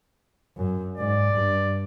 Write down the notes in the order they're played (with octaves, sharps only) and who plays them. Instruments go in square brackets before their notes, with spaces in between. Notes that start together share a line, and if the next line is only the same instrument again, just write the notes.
[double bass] F#2
[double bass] G#2 [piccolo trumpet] D5
[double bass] G2